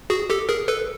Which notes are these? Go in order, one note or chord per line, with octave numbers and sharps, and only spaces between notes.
F#4 G#4
G4 A4
G#4 A#4
A4 B4